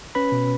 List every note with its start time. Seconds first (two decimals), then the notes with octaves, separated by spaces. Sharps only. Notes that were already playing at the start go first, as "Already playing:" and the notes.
0.15 C#4 B4 B5
0.32 B2